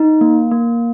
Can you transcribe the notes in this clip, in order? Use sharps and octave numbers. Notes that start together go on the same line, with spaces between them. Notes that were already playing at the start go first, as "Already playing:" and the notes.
Already playing: D#4
A#3
A#3